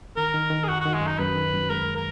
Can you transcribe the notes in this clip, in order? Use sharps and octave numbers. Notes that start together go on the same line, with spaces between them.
D#3 A#4
D#3
D#3
G#4
F#2 F#4
D#3 F#4
G#3
F#2
D#4
F#2 B4
D#3
F#2
G#3 A#4
A#4